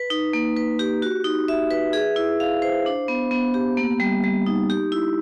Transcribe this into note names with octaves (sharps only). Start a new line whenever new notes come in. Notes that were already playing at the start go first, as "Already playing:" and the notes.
Already playing: B4
D#4
A#3
B4
G4
F#4
D#4
E5
B4
G#4
E4
F5
C5
D4
B3
B3
G4
A#3
G3
G3
D#4
G4
E4